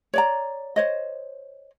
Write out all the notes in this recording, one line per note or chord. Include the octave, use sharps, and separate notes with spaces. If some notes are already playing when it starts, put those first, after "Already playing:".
C#5 D5 A#5
C5 C#5 D#5